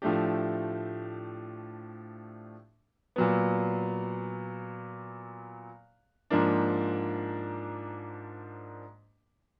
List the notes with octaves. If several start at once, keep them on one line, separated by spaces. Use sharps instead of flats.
A2 F3 A3 D4 G4
A#2 F#3 B3
G#2 F3 A#3 D4